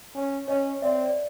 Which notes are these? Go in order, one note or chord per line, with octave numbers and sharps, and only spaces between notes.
C#4
C#4 C#5 D#5
C4 D5 E5
D5